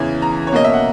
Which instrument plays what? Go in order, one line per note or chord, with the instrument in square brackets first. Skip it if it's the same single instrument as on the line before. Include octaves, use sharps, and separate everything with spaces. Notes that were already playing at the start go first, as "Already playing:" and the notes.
Already playing: [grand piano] E2 C#3 E3
A#5
C#5
B2 A#3 C#4 D#5
E5
F#5